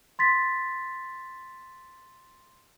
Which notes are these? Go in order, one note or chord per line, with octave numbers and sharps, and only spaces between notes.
C6 A6 B6